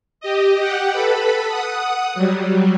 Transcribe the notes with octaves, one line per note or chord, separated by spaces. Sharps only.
G4 D#5
G4 F#5 G5
A4 B4 B5
F#5 D#6
F#3 G3